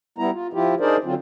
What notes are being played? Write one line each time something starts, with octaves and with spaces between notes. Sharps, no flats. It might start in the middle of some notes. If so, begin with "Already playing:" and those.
G3 B3 E4 A#5
F4
F3 E4 F4 G4
D4 D#4 G#4 A#4 C5 D5
D3 F#3 C4 F4